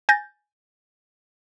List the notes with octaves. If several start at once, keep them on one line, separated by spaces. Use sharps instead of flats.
G#5 G6 A6 A#6